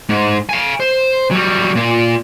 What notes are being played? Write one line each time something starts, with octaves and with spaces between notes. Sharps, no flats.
G#2
F5 G#5
C5
F#3 G3
A#2 F4